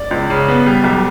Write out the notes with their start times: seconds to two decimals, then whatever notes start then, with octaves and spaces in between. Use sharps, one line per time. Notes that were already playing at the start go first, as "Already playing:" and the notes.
Already playing: D5
0.11 C#2
0.30 C#3
0.48 B3
0.66 G3
0.84 B1